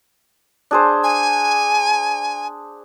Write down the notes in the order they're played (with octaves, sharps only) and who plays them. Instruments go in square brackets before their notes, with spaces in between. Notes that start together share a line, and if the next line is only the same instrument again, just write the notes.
[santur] D4 G#4 C5
[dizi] G#5